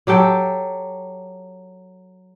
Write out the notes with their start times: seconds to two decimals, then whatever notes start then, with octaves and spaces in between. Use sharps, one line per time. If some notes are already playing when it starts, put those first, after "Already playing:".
0.07 F#3 G4 A4 G5